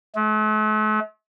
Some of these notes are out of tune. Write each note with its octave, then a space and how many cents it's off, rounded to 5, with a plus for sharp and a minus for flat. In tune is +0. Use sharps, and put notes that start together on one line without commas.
A3 -45